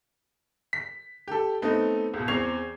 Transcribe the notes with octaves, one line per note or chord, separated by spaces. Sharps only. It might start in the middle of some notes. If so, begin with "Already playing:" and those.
B6
G4 A4
A3 B3 C4 D#4
C#2 B2
E2 C4 C#6 G#6 C7 F7